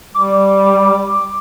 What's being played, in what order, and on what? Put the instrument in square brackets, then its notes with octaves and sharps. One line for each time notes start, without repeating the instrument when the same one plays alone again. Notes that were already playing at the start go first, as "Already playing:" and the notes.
[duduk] G3 [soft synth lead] D6